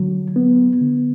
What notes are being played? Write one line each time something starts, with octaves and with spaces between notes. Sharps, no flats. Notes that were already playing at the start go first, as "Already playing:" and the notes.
Already playing: D3 F#3
B3
D3